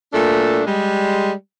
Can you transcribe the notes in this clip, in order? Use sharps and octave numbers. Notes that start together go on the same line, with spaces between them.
A#2 F#3 A3 D4 A4
G3 G#3